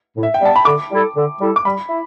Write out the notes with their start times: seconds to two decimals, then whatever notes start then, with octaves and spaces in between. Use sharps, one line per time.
0.17 A2
0.23 E5
0.34 G5
0.42 G3 B3 A5
0.56 B5
0.65 D3 D6
0.91 G3 E4 A4
1.16 D3
1.41 G3 E4 A4
1.56 D6
1.65 G3 B5
1.90 E4